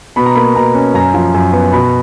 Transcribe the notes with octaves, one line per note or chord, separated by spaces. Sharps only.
B2 B5
A#5
A#3 B5
B2 A#5
C#4
F#2 A#5
F3
F#2
B3
B2 B5